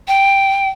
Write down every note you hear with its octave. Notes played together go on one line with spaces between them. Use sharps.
G5